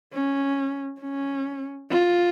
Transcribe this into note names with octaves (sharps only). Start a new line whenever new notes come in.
C#4
C#4
F4